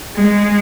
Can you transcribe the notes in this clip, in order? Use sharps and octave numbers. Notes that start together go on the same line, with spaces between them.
G#3